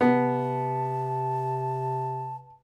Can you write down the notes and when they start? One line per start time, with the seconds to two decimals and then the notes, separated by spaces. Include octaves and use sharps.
0.01 C3 B3 A5